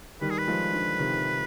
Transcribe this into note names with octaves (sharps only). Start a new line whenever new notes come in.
D#3 G3 B4
G#4
B4
F3 G#3
D3 F3
C3 D#3